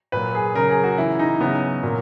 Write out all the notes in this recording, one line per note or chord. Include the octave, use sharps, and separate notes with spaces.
A#2 F#3 B4
G#4
C#3 F#3 A#4
G#4
F#4
C#3 E3 E4
D#4
C#3 F#3 B3
A#2 F#3